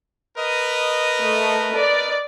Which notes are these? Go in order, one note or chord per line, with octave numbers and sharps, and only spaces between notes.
A#4 B4 D#5
A3
D5